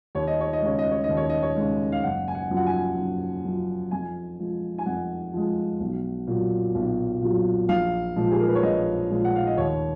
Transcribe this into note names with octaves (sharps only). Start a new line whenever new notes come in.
D#2 C#5
D#5
C#5
D#5
C#3 G#3 C#5
D#5
C#5
D#5
D#2
C#5
D#5
C#5
C#3 G#3
F5
F#1 F#5
G#5
F#5
F#2 F3
F#5
G#5
F#1
F#2 F3
F2 G#5
F3 G#3
G#5
F2 F#5
F3 G#3
B1
A#2 F#3
B1
A#2 F#3
A#1 F5
A#2 F3 G#3
G#4
A#4
B4
C#5
A#1 D#5
A#2 F3 G#3
F#5
F5
D#5
D#2 C#5